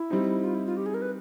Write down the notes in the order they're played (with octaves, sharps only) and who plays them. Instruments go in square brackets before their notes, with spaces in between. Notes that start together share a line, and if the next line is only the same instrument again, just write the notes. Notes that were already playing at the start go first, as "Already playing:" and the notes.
Already playing: [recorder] E4
[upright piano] G3 C4 D#4
[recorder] F4
E4
F4
G4
G#4
A#4
B4